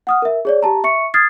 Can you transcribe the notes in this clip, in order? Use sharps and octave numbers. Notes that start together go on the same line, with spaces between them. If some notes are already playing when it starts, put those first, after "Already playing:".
F#5 D#6 F6
A#4 E5
G#4 C#5 D5
G4 A5 A#5
E5 C#6 C#7
D#6 F6 G#6 A6 C7